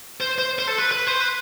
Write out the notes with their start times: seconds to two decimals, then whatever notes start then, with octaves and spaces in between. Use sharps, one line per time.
0.21 C5
0.38 C5
0.59 C5
0.67 A4
0.78 B4
0.91 B4
1.07 C5
1.21 B4